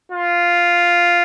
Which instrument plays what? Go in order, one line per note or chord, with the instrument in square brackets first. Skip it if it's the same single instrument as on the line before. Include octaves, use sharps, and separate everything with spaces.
[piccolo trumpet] F4